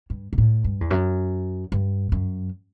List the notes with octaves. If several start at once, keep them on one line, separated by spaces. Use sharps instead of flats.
G2
B2
A2
G2
E2
F#2
G2
F#2